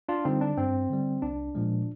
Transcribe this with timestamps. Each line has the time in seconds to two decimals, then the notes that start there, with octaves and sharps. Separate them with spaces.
0.09 D4 F4
0.25 D3 G3 C4 D#4
0.41 D4
0.57 G2 C4
0.90 D3 G3
1.22 C2 D4
1.55 A#2 F3 G#3